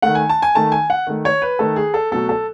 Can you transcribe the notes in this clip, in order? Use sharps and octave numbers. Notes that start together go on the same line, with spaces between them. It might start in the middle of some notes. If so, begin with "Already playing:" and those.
D#3 A3 F#5
G#5
A5
G#5
D#3 A3 A5
G#5
F#5
D#3 A3
C#5
B4
D#3 A3 A4
G#4
A4
B2 F#3 A3 A4
A4